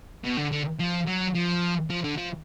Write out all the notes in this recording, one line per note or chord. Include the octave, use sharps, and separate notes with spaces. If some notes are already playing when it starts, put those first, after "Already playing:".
B2
D3
D3
F3
F#3
F3
F3
D3
F3